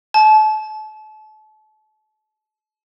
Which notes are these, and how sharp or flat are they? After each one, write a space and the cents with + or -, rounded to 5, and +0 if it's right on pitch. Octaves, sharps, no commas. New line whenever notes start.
A5 -35